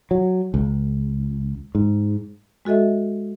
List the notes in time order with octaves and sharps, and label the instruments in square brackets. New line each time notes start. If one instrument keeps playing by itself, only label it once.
[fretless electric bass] F#3
C#2
G#2
[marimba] G#3 F#4 A4 D#5 E5